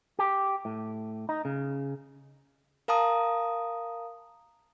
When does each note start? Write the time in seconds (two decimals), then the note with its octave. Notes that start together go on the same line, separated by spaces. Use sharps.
0.19 G4
0.65 A2
1.29 D#4
1.45 C#3
2.88 A#4 F5 A5 A#5 D#6